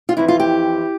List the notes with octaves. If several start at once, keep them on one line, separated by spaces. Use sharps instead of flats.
F4
F2 E3 E4
F4
G4